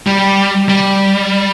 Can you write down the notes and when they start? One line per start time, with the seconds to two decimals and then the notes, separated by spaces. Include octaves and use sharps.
0.07 G3
0.69 G3